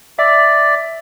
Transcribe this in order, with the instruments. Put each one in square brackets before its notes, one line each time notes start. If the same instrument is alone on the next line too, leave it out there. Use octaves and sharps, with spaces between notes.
[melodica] D5 [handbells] E5